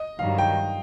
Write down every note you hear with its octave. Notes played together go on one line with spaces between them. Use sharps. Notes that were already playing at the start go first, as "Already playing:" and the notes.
Already playing: D#5
G2 D#3 F#3 F5
G5